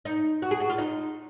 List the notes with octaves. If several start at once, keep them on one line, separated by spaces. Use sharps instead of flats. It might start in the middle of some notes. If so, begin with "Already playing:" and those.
D#4
F#4
G#4
F#4
F4
D#4